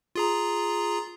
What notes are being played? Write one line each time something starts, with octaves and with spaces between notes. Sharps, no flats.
F4 G#4 A#5